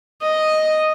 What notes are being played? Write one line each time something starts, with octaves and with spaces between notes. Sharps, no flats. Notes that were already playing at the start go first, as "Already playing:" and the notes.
D#5